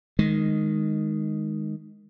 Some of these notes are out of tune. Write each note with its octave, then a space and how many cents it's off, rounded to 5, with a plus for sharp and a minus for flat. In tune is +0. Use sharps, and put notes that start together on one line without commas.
D#3 -5 G#3 +0